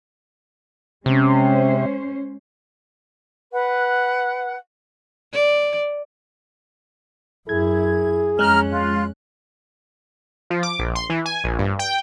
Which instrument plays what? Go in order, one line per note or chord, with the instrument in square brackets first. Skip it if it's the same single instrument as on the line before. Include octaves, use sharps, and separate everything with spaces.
[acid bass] C3 [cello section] G#3 C#4 C5
[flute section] B4 F#5
[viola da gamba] D5
[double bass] F#2 E4 [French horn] G#4 [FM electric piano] G#6
[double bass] F2 C#4 [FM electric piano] G#3 F#6 [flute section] A#5 F6
[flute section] F4
[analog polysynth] F3
D6
A#1
C6
E3
G#5
A#1
G2
G5